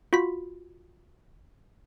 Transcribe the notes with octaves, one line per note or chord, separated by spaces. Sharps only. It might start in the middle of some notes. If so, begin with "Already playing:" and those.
F4 F#4 B5 B6